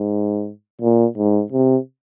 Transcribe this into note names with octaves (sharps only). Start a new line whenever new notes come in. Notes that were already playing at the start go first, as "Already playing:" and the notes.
Already playing: G#2
A#2
G#2
C3